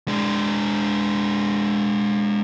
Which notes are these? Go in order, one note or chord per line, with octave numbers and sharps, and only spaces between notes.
G#3 D4